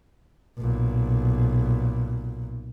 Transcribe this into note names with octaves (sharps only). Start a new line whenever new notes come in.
B1 A#2